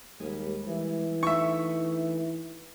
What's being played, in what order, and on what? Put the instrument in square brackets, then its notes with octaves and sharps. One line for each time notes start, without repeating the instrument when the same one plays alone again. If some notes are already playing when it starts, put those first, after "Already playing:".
[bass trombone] D#2 [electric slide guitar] G3 G#3
[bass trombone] E3
[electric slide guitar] A3 D#4 [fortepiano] E5 C#6